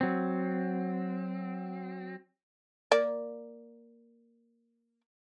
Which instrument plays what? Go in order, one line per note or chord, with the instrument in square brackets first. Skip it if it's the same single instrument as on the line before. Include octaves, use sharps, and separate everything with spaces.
[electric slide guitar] F#3 C4
[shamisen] A#3 D5